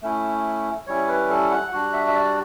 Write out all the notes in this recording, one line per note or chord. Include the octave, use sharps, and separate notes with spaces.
A3 C#4 E4
G3 C#4 E4 C#5
B4
A4
F#5
G3 D4 F#4 F#5
E5
E5
D5